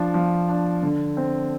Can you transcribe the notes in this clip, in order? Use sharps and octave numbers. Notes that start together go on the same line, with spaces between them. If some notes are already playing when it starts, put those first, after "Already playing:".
Already playing: F3 D4
F3
D4
D3
C4